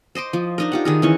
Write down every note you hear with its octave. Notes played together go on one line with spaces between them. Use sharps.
C5 D#5 C6 D6
F3
D4 D#4 A#4
F4 G4 F#5
D#3 G#4 A#4
E3 C#4 C#6